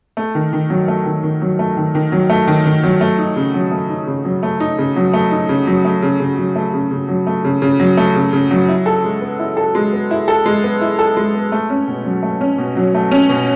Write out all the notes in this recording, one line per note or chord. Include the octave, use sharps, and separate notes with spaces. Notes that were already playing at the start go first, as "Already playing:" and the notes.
A3
D#3
D#3
F#3
A3
D#3
D#3
F#3
A3
D#3
D#3
F#3
A3
D#3
D#3
F#3
A3
D#4
C#3
F#3
A3
D#4
C#3
F#3
A3
D#4
C#3
F#3
A3
D#4
C#3
F#3
A3
C#3
C#3
F#3
A3
C#3
C#3
F#3
A3
C#3
C#3
F#3
A3
C#3
C#3
F#3
E4
A4
G#3
B3
E4
A4
G#3
B3
E4
A4
G#3
B3
E4
A4
G#3
B3
A3
C#4
B2
F#3
A3
C#4
B2
F#3
A3
C#4
B2